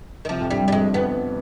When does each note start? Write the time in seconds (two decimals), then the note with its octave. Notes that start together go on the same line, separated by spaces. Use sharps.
0.25 D#3
0.29 C3 F3
0.41 F2
0.51 G2 G3
0.68 G3
0.72 F2 G#3
0.94 F2 B3